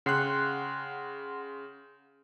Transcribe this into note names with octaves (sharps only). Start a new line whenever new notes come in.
C#3 F#5 G5 C6 F#6